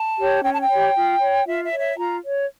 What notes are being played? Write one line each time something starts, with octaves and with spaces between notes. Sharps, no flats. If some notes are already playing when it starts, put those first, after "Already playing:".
Already playing: A5
G4 C#5
C#4 G5
A5
G5
G4 C#5
F4
C#5
F4 E5
E5
C#5
E5
F4 A#5
C#5